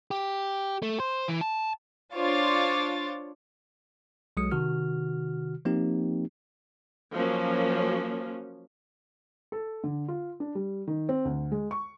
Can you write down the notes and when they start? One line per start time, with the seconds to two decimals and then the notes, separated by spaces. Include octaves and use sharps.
0.11 G4
0.82 A3
1.00 C5
1.28 E3
1.41 A5
2.15 D4 F4 C5 C#5 D6 A6
4.37 B1 F#3 G#3 D#6 C#7
4.51 C3 D#3 F#4 F6
5.65 F3 A#3 C4 D#4 G4
7.13 F3 F#3 A#3 C#4
9.52 A4
9.84 D3
10.08 F4
10.40 D4
10.55 G3
10.87 D#3
11.09 C4
11.25 D2
11.52 G#3
11.71 C#6